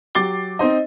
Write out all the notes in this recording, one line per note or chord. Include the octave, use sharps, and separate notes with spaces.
F#3 G4 D6 A6 C7 G7
C4 D#4 C5 D#5